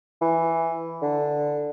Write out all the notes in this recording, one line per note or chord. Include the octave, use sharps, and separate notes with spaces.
E3
D3